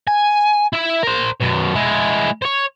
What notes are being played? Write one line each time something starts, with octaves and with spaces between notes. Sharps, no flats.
G#5
E4 E5
A#4 C5
F#2 B2
G#3 E4
C5 C#5